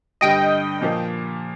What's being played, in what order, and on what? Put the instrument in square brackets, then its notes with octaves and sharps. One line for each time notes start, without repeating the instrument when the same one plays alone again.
[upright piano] G2 D3 G3 [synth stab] D#5 G5
[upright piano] A#2 F3 A#3